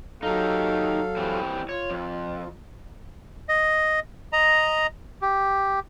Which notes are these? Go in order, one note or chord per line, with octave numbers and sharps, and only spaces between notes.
F#3 D#4 G4 A4 F5
E3 G3 C4
F4 C#5
F2
D#5
D#5 A#5
G4